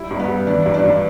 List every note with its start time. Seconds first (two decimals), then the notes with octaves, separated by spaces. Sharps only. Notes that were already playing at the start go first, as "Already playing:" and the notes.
Already playing: G3 E4
0.11 G2
0.19 B3
0.28 G3
0.47 E3 D4
0.66 G2
0.74 D4
0.84 G2